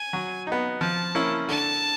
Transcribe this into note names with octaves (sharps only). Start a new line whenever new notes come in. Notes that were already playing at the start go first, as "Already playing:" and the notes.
Already playing: G#5
F#3
B3 D#4
F3 A5
A#3 C#4 E4
D3 A5